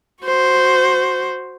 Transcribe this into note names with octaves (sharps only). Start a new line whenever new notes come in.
F#4 C5